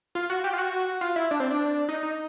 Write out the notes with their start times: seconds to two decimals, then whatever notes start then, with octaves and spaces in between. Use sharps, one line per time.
0.15 F4
0.30 F#4
0.44 G4
0.53 F4
0.58 F#4
1.01 F4
1.16 E4
1.31 D4
1.40 C4
1.50 D4
1.89 D#4
2.03 D#4